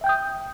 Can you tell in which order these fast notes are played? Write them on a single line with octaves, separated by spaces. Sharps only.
E5 G5 G6 D#6